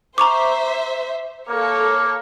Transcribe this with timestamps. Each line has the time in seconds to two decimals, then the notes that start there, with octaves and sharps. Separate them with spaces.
0.18 C5 E5 A#5 C#6 D6
1.49 A#3 A4 C#5